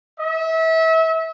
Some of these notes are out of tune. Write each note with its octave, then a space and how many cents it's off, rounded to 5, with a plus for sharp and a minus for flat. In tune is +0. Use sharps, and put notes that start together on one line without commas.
E5 -30